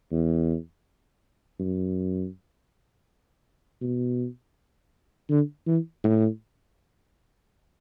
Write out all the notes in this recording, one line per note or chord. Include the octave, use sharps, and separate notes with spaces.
E2
F#2
B2
D3
E3
A2